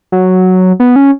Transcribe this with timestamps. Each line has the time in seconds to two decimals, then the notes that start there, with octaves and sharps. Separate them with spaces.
0.12 F#3
0.80 B3
0.96 C#4